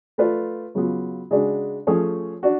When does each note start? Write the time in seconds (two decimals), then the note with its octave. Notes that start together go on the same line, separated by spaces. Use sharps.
0.18 A3 F4 B4 D5
0.75 C#3 F#3 B3 F4
1.31 C#3 G#3 D4 F#4
1.87 F3 A3 C#4 G#4 C#5
2.43 D4 F#4